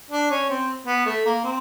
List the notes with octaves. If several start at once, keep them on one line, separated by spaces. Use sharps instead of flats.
D4
C#4
C4
B3
A3
A#3
C4